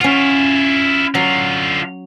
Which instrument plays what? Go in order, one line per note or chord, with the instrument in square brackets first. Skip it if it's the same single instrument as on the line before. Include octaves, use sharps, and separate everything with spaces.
[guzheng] C#4 F#5 [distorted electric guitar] E4 F4
[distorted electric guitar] D3 F4 [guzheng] F#3